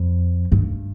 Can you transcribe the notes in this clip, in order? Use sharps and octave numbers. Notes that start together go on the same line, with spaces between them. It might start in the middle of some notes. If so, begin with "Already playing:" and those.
Already playing: F2
G2